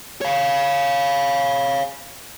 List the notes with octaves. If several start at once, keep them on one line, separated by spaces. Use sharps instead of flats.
C#5 F5